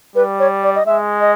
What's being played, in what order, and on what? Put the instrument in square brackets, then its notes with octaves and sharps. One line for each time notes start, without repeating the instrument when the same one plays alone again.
[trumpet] G3 [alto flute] B4
[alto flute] C#5
D5
D#5
[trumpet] G#3 [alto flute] E5
[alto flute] D#5